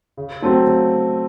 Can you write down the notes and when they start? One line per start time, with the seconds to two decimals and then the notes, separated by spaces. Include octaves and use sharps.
0.17 C#3
0.42 F#3 A3 C4
0.66 C#3